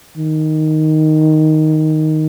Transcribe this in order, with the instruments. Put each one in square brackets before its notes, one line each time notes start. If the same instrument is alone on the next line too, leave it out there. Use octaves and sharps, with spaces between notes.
[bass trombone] D#3